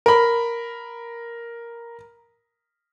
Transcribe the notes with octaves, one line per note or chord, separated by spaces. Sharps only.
A#4 B5